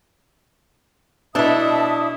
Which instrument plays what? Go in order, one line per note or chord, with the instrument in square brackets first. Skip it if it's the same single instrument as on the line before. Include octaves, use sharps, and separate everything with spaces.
[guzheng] B2 A4 [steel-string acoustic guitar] D4 E4 [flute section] E5 A5 D#6